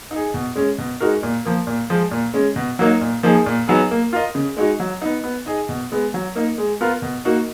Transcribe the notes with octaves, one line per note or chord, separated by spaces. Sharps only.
D#4
G#4
B2
G#3 C#4
B2
G#3 D#4 F#4 A#4
A#2
F3 A#3
A#2
F3 G#3
A#2
G#3 C#4
B2
F#3 A#3 D#4
A#2
F3 A#3 D#4 G#4
A#2
F#3 B3 D#4 G#4
A#3
F4 A#4 D#5
C#3
G#3 D#4 F#4
F#3
B3 D#4
B3
D#4 G#4 D#5
B2
G#3 B3
F#3
A#3 D#4
G#3
B3 F4 A#4
B2
A#3 D#4 F#4